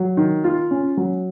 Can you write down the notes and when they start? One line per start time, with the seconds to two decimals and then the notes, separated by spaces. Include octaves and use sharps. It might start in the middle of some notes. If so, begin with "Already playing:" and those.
Already playing: F#3
0.17 D#3
0.44 F4
0.71 C#4
0.97 F#3